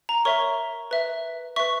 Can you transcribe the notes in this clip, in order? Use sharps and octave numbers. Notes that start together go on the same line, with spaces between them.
A#5
A#4 C#5 E5 C#6
B4 E5
B4 E5 C#6